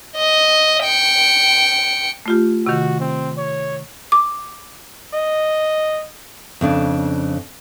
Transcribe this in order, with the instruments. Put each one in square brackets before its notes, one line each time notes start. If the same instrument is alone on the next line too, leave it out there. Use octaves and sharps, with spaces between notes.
[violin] D#5
G5 C#7
[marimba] A3 F4 G4
[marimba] C3 D#3 [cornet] F#4
[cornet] C4
C#5
[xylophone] D6
[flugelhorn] D#5
[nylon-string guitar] F2 C#3 D4